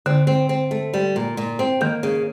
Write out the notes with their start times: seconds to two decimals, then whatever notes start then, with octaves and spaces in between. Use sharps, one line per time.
0.06 D3 C4
0.27 C4
0.49 C4
0.71 A3
0.94 G3
1.16 A#2
1.37 A#2
1.59 C4
1.81 D#3 A#3
2.03 C#3